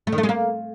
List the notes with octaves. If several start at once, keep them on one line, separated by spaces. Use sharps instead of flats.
A3
D#3
A3
G#3
A#3